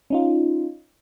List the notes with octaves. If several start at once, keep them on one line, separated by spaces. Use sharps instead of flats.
C#4 D#4 F4